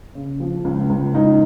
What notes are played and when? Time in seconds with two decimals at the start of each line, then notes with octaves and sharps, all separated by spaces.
0.15 C#3
0.40 F3
0.64 C#2
0.89 C#2
1.14 C#2 D#4